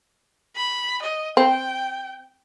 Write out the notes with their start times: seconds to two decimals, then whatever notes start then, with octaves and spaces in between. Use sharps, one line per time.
0.56 B5
1.02 D#5
1.37 C4 G5